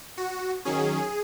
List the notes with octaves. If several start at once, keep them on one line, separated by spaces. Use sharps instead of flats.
F#4
D#3 F#3 C#4 G#4